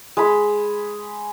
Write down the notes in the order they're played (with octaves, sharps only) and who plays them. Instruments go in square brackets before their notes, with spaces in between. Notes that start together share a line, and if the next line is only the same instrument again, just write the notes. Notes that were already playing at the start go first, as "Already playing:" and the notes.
[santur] G#3 B5